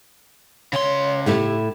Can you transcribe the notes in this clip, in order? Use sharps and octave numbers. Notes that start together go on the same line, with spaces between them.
C#3 C#5 C6
A2 A3 E4 G4